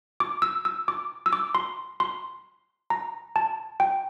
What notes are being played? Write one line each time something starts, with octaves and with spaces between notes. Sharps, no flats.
D6
E6
E6
D6
E6
D6
C6
C6
A#5
A5
G5